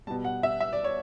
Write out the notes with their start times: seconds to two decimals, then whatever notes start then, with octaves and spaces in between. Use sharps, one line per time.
0.07 G3 A5
0.11 B2
0.25 F#5
0.43 E5
0.61 E5
0.73 D5
0.84 C#5